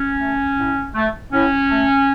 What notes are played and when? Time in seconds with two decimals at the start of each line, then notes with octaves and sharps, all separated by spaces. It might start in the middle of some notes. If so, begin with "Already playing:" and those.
Already playing: C#4
0.20 A3
0.57 A2
0.94 A3
1.32 A2 C#4
1.69 A3